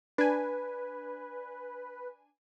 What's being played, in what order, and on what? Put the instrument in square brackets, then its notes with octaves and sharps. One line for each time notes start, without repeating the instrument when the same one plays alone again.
[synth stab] D4 G#5 [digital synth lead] B4